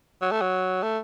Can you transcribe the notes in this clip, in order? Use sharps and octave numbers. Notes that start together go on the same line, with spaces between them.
F#3
A3
F#3
A3